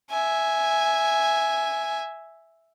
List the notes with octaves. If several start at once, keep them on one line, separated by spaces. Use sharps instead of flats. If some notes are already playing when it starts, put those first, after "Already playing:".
E5 G#5